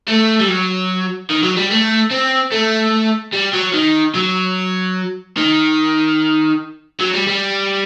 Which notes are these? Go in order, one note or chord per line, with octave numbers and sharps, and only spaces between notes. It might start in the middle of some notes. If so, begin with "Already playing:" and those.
A3
G3
F#3
D#3
F#3
G3
A3
C4
A3
G3
F#3
D#3
F#3
D#3
F#3
G3
G3